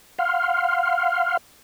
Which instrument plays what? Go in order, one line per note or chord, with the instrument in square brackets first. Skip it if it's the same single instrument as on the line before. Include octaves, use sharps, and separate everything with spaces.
[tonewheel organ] F5 F#5 C6 F6